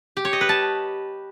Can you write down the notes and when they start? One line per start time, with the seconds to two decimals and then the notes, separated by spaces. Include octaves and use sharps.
0.17 G4
0.25 C#5
0.33 D#5
0.41 B4
0.49 A5